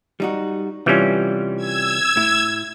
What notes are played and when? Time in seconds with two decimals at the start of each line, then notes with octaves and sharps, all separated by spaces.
0.20 G3 D#4 F#4
0.86 C3 E3 G3 C#4 F4
1.56 E6 G#6
2.17 A2 E4